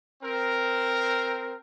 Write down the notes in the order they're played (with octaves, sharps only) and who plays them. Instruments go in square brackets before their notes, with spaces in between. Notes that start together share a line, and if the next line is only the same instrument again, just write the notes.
[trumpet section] C4 A#4